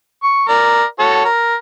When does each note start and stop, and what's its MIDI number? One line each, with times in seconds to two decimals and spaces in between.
0.23 0.44 85
0.49 0.83 70
0.49 0.83 74
0.99 1.25 66
0.99 1.25 69
0.99 1.25 73
1.25 1.55 70